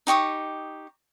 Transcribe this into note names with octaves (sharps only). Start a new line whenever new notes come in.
D#4 G4 C#6 D#6